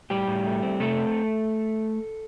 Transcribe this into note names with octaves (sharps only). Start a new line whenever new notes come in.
A2 G3 G4
A2
A3
C4
C3 A3 A4
C4